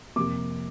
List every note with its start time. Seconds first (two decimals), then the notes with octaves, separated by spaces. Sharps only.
0.16 F2 C3 A#3 D6